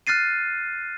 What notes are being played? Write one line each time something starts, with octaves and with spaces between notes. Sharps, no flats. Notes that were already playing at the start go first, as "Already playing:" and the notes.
F6 F#6 A6 C7 D#7